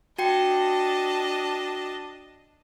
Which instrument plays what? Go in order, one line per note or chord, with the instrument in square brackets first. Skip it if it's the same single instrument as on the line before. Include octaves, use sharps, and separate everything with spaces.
[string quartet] D4 D#5 A5 [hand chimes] F#4 G5 C#7